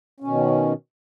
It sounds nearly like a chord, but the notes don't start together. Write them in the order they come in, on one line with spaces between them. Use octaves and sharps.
C#4 B2 D#3